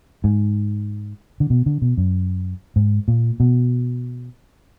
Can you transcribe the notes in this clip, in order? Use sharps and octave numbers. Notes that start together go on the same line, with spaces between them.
G#2
D3
B2
D3
B2
F#2
G#2
A#2
B2